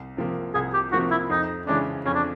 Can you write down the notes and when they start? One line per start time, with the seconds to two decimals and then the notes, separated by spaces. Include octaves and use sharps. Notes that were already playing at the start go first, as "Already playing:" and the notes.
Already playing: C2
0.17 C3 F3 A#3
0.54 C2 G#4
0.73 G4
0.92 C3 F3 A#3 F#4
1.11 E4
1.30 F2 D#4
1.67 C#3 E3 G#3 C#4 D4
2.05 F2 C#4
2.14 D4